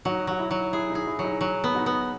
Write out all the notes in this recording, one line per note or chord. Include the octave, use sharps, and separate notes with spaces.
F#3 D#4 F#4
F#3 F#4
E4
F#3
E4 G#4
D#4
G#4
E4
F#3
D#4
F#3
B3
D#4 F#4
B3